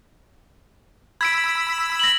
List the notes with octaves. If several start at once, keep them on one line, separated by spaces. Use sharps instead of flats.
B5 E6 G#6 B6 D7
A#6 F#7